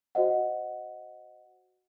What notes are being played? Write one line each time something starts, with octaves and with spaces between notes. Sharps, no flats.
F#4 C5 D#5 F#5